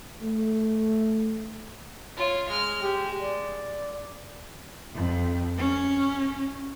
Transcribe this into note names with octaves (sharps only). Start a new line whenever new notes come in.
A3
F4 C#5
G#3 F6
G#3 G4
D5
F2
C#4